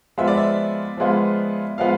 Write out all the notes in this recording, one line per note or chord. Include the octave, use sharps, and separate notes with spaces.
F3 G#3 B3 F4 E5
D5
E5
F3 G#3 B3 F4
F3 G#3 B3 F4 F5